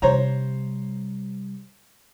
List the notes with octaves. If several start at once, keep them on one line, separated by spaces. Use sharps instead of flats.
C3 G3 C5 C#5 A#5